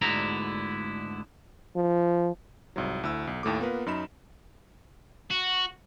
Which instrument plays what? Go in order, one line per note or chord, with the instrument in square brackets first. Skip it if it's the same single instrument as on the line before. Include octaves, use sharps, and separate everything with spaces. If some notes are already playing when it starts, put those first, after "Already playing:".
[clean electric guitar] D2 G#2 D3 B3 E4 A#5
[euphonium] F3
[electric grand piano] C2 G#2 F#3
D2 E4 E6
B1
D#2 A2 A3 D6
A#3 B3 F4 A#4 B4
F#2 D#4 B5 E7
[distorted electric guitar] F#4